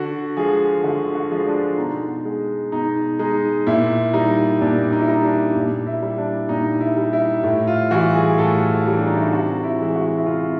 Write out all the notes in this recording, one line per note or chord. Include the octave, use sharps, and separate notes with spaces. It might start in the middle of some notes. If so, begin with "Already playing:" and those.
Already playing: D3 F#4
F3 G#3 G#4
D3 F#4
F#4
F3 G#3
D4
B2 D#4
G#3
B2 D#4
G#3 D#4
A#2 E4
G3 D#4
A#2 D4
D#4
E4
G3 D#4
D4
A#2
E4
G3
D4
A#2 D#4
E4
G3
E4
A2 E4
F4
E3 G3 F#4
G#4
A2 A4
F#4
E3 G3 G4
D4
D#4
E4
F4
C3 F#4
E4
E3 G#3
F#4
E4
C3 F4